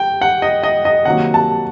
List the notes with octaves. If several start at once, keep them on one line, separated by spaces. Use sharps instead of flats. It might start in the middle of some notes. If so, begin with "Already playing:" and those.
Already playing: G5
F#5
D#5
D#5
D#5
C3 D#3 F#3 A#3 F#5
A5